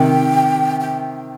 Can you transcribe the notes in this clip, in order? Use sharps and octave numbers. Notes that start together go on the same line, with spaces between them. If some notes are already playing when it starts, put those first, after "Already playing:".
Already playing: C3 D#3 G5
G5